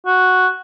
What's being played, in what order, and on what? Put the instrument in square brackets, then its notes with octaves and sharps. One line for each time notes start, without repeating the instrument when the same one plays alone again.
[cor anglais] F#4